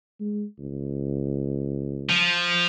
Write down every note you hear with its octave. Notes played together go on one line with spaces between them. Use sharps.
G#3
C#2
F3